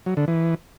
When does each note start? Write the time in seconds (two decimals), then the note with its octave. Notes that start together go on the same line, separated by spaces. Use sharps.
0.06 F#3
0.17 D3
0.28 E3